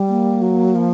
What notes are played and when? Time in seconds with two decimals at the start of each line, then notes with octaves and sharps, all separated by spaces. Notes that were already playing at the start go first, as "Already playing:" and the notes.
Already playing: G3
0.09 A#3
0.42 F#3
0.75 F3